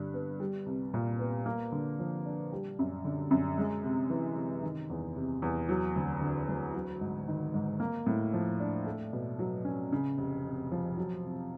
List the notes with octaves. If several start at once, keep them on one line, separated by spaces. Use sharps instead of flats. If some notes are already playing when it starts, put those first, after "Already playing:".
Already playing: G2 D3
B3
G3
C2
A#2
B3
A#3
D3
F3
D4
G3
F#2
D3
F#2
G#3
C3
E3
C3
D#3
E2
C3
E2
F#3
D2
D3
D2
F#3
G#2
D#3
G#2
A#3
A2
F3
D4
A3
B2
F#3
C#4
C#3
F1
F2
F3
F#3
C3